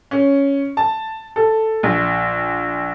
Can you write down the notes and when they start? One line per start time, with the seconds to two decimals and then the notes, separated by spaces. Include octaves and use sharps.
0.11 C#4
0.77 A5
1.36 A4
1.83 A#1